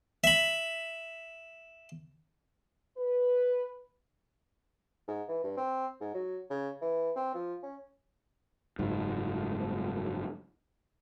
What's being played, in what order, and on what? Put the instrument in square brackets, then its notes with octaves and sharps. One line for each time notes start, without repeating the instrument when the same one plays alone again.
[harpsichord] E5 B5
[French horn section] B4
[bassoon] G#2
E3
G2
C4
G#2
F#3
C#3
E3
C4
F3
C#4
[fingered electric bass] F#1 G#2 G#3